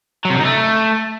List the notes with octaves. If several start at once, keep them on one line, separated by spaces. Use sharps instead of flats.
F#3
C3
D3
D#4
A3